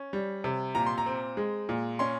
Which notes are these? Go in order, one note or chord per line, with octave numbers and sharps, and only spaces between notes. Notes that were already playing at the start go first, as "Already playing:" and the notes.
Already playing: C#4
G3
C3
A#2 A#5
C6
A#5
C4
G#3
A#2
C#4 C6